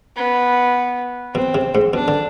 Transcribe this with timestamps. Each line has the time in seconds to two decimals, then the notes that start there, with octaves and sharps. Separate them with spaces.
0.17 B3
1.35 B2 C4
1.55 C3
1.75 G#2
1.93 B2 D4
2.08 D3